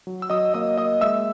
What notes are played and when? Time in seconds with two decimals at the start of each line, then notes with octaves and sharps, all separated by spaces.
0.07 F#3
0.22 E6
0.30 F#3 D#5 D#6
0.54 A#3 D#5 D#6
0.78 A#3 D#5 D#6
1.01 G#3 E5 E6